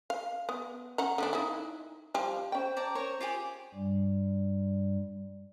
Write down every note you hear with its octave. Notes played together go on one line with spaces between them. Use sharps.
F5
B3
C#4 F#5 A#5
D3 B3 D4
D#4 E4
F3 G3
C#4 C5 G5
D5 A5 A#5
A#4 C5 C#5 C#6
F4 G4 G#4
G2 G3